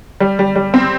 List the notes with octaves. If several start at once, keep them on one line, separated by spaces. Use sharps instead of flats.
G3
G3
G3
C4